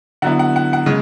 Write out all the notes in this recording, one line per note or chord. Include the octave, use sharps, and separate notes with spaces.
D3 F#3 B3 E4 F#5
F#5
F#5
F#5
C#3 G#3